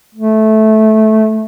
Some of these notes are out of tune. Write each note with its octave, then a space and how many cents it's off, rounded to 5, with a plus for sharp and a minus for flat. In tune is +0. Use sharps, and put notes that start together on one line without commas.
A3 -15